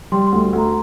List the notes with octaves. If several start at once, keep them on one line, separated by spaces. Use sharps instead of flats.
G3 C6
C6
D2
C6
D2
A#5